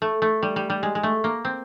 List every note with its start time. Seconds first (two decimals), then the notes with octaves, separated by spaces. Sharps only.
0.02 A3
0.22 A3
0.43 G3
0.56 G3
0.70 G3
0.83 G#3
0.95 G#3
1.03 A3
1.24 A#3
1.45 C4